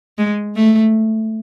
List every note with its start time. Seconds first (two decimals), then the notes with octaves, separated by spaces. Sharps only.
0.18 G#3
0.56 A3